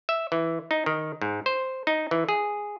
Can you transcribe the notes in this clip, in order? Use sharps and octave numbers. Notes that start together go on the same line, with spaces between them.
E5
E3
D#4
D#3
G#2
C5
D#4
E3
G#4